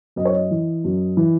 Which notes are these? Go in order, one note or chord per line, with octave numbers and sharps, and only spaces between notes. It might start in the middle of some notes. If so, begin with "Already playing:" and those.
F#2 D#5
C#5
D#5
E3
F#2
E3